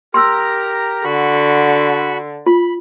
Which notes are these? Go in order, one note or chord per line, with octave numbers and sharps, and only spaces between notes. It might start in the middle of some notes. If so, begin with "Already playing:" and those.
G4 A#4 A#5 C6 E6
D3 F#4 B5 C#6
F4 B5